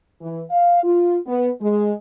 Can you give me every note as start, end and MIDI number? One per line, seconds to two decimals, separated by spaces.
0.21 0.43 52
0.51 0.82 77
0.84 1.18 65
1.26 1.50 59
1.61 1.94 56